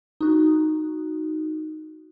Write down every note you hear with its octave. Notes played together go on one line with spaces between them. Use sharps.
D#4 F#4